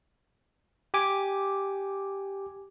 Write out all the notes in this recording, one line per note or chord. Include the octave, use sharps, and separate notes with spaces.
G4 G#5 D6